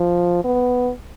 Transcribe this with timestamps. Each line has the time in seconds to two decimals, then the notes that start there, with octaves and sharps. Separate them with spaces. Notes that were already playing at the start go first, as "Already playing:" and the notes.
Already playing: F3
0.44 B3